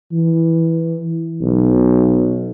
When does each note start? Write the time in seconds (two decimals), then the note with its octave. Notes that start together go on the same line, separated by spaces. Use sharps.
0.12 E3
1.42 B1